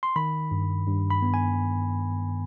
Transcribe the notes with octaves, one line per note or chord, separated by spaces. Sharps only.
C6
D#3 B5
G2
G2
B5
B3
G#5